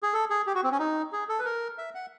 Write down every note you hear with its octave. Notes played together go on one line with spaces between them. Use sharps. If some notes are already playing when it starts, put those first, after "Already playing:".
G#4
A4
G#4
G4
F#4
C4
C#4
D#4
G#4
A4
B4
A#4
E5
F#5